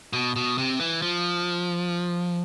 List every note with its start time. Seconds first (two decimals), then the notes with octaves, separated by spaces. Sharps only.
0.13 B2
0.36 B2
0.58 C3
0.80 E3
1.02 F3